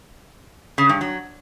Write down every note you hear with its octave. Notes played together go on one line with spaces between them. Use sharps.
C#3
G2
F#3